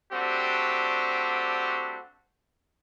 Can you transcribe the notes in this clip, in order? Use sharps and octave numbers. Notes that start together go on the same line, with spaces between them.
G3 A3 C4 D4 F#4 G4